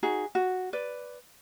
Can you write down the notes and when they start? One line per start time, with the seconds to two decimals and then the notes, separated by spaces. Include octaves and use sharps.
0.03 D#4 F#4 G#4
0.35 F#4
0.73 B4 D5